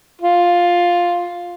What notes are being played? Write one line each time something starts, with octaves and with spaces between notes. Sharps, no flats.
F4